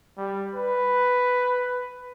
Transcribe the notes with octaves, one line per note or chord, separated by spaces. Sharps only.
G3
B4